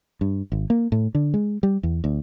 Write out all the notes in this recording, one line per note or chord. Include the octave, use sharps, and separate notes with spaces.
G2
G#1
A#3
A2
D3
G#3
G3
E2
D2